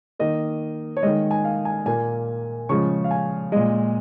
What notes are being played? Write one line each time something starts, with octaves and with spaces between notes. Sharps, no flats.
D#3 A#3 D#5
C#5
D#3 G#3 D#5
G#5
F5
G#5
A#2 A#3 G#5
C#3 F3 G#3 C#6
F5
G#5
A#2 G#3 D#5